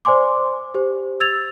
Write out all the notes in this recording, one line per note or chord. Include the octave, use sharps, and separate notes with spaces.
C5 D5 G#5 C6 D6
G4 C5
E6 G#6 A6 F7